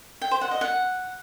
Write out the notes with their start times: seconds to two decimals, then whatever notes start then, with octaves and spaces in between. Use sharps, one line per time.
0.21 G5
0.31 C5
0.41 F#5
0.51 D#5
0.61 F#5